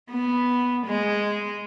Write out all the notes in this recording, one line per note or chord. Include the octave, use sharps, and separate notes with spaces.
B3
G#3